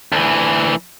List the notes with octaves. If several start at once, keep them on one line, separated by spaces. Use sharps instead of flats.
D2 E3